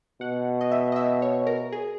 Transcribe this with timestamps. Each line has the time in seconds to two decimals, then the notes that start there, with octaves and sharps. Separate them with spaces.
0.21 B2 F#5
0.61 D#5
0.71 E5
0.92 D#5
0.96 E5
1.22 C#5
1.47 A#4
1.72 G#4